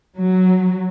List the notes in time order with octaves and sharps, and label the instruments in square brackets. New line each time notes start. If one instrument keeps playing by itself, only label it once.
[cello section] F#3